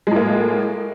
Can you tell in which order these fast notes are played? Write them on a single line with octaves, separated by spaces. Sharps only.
G#3 A2 A#3